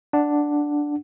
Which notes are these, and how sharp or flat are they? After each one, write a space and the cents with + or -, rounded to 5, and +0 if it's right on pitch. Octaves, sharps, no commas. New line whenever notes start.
D4 +0 F#5 +0